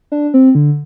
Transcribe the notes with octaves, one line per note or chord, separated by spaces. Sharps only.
D4
C4
D3